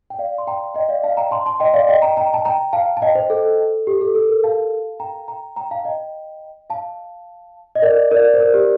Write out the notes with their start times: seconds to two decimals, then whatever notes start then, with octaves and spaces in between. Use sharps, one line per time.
0.10 G5
0.19 D5 F5
0.38 C6
0.47 G5 A#5
0.74 D#5 G5
0.89 D5 F5
1.04 F5 A5
1.17 G5 A#5
1.31 A5 C6
1.46 A5 C6
1.60 D#5 G5
1.74 D5 F5
1.89 D#5 G5
2.02 G5 A#5
2.17 G5 A#5
2.34 A5
2.45 G5 A#5
2.73 F5 A5
2.97 A5
3.02 D#5 G5
3.15 C5
3.30 A4
3.87 G4
4.01 A4
4.15 A4
4.29 A#4
4.44 F5 A5
5.00 G5 A#5
5.28 G5 A#5
5.56 G5 A#5
5.71 F5 A5
5.85 D#5 G5
6.70 F5 A5
7.75 D#5
7.82 A#4 D5
8.11 A#4 D5
8.34 C5
8.40 A#4
8.54 G4